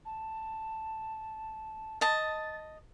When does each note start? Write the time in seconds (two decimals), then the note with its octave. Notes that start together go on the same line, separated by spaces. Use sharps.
0.05 A5
2.01 D#5 A5 A6